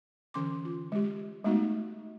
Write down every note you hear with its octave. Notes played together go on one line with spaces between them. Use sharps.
D3 E3 C#4 C6 D6
F4
G#3 G4
G#3 A3 B3 D#4 F#4